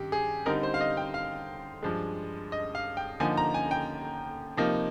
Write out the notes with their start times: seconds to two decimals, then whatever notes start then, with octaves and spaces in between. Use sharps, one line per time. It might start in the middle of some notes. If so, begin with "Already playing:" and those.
Already playing: G2 D#3 G4
0.12 G#4
0.46 D3 G3 C4 D#4 A#4
0.63 C5
0.74 F5
0.81 D#5
0.97 G5
1.14 F5
1.83 G2 F3 G#3
2.52 D#5
2.75 F5
2.97 G5
3.20 D3 F3 A#3 D#4 G#5
3.37 A#5
3.54 G#5
3.71 G5
4.57 C3 F3 A#3 D#4